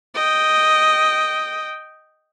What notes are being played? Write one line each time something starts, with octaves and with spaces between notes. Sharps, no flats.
D#5 G5